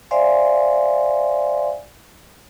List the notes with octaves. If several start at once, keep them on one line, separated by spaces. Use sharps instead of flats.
C5 D5 E5 F5 G#5 C6